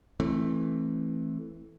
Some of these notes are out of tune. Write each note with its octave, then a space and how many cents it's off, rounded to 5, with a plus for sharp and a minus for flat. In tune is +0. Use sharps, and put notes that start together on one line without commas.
E3 +0 A3 +0 C4 +35